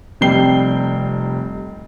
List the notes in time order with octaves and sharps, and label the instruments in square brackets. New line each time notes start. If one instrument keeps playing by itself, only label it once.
[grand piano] F1 C3 G3 G5 C7 G7